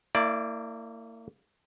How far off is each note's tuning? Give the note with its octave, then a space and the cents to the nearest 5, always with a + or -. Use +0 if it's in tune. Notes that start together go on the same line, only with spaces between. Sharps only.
A#3 -35 E4 +0 D5 +0